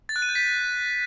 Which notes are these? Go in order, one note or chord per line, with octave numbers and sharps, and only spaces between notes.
A6
F#6
D#7
G6
B6